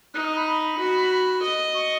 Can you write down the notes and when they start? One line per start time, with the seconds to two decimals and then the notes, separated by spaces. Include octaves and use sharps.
0.14 D#4 F#6
0.25 D#6
0.36 B5
0.46 B5
0.79 F#4
1.43 D#5
1.74 C#6